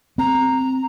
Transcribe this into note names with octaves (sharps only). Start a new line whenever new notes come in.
C4 A#5